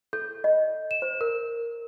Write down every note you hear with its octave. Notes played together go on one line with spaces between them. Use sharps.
A4 G6
D#5
E7
C5
A#4